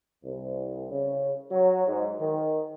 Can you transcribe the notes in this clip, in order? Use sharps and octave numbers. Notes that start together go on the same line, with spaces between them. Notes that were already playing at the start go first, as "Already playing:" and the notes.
C2
C#3
F#3
G#2
D#3